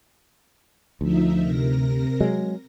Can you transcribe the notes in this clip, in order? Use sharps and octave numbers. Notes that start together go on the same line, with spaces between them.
D2 F3 D#4 E5
C3 A#4 A#6
F#3 G#3